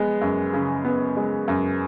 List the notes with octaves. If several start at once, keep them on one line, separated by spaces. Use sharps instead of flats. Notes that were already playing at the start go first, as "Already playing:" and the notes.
Already playing: G#3 B3
F#2
C#3
B3
G#3
F#2